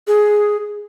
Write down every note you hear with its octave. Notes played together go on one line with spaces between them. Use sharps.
G#4